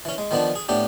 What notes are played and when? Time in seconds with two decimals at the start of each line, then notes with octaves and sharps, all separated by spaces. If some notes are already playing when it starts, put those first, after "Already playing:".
0.05 E3 C#4
0.18 G#3
0.31 D#3 F3 B3 D4
0.55 G#4
0.69 A2 B3 D4 G4